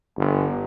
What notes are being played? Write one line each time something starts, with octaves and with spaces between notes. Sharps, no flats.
G1